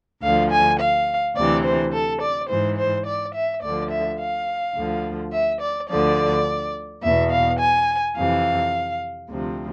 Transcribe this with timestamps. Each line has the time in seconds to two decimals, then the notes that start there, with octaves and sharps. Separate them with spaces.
0.23 D2 D3 F3 F5
0.51 G#5
0.80 F5
1.36 D2 C3 E3 D5
1.64 C5
1.93 A4
2.21 D5
2.49 G#2 E3 C5
2.77 C5
3.06 D5
3.34 E5
3.62 D2 D3 F3 D5
3.91 E5
4.19 F5
4.76 D2 D3 F3
5.32 E5
5.61 D5
5.89 D2 D3 F3 D5
7.03 E2 B2 E5
7.31 F5
7.59 G#5
8.16 F2 C3 E3 F5
9.29 D2 C3 F3